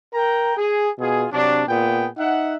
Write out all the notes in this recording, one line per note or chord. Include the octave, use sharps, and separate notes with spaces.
A#4 G5 A#5
G#4
B2 F4 G#4
C3 F#3 D4
A#2 B3 G#4 G5
D#4 E5 F#5